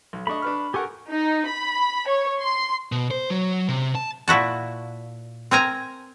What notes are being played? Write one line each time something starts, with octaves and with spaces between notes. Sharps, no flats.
B1
A3 D4 D#5 B5 C#6
D4 B4 F6
G4 A4 A#4 F#5 G#5 C#6
D#4
B5
C#5
C6
B2
C5
F#3
C3
A5
A#2 E4 F#4 A5
C4 A#4 G#5 A#5